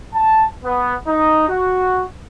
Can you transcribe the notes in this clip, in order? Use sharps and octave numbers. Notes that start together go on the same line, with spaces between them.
A5
B3
D#4
F#4